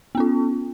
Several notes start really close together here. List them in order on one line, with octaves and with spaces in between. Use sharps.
B3 C#4 F4